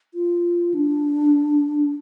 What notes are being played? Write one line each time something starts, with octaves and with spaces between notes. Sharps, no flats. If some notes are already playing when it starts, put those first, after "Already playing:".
F4
D4